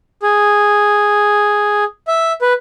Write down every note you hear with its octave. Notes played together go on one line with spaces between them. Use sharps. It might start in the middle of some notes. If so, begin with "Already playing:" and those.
G#4
E5
B4